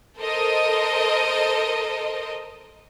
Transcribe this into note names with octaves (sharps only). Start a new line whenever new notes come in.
A4 A#4 C5 D#5